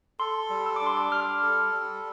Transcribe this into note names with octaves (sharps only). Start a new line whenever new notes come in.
A4 C6
G3
E6
D6
D4
C6
D6
G3 F6
A4
G3